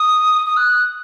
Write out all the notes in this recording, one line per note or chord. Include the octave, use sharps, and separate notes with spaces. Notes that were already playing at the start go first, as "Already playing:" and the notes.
Already playing: D#6
D#6
F#6